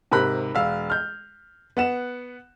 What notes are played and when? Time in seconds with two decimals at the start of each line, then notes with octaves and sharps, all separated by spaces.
0.11 G#2 C3 A#4 B5 F#6
0.55 E1 F5 E6
0.90 F6 G6
1.77 B3 F#5 E7